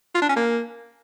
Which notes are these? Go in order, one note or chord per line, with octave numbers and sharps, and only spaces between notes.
F4
D4
C#4
A#3